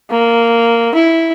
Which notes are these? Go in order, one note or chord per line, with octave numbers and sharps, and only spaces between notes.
A#3
E4